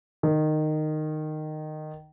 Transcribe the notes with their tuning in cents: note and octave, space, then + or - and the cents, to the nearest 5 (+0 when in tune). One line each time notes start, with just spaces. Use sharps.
D#3 -15